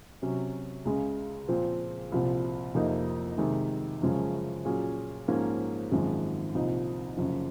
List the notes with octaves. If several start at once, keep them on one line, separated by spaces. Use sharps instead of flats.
C3 F#3 C#4
C#2 C#3 G#3
A#2 F3 C4
C2 A#2 F3 C4
F2 C3 F3 A#3 D#4
C3 D#3 G#3
F#2 C#3 F3 G#3 C#4
A#2 F#3 C#4 G#4
G#2 F3 A#3 C#4
G#1 F#2 F3 G#3
C2 A#2 F3 C4 D#4
F#1 F#2 F3